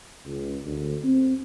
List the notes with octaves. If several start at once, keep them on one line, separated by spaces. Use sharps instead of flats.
C#2
D2
C4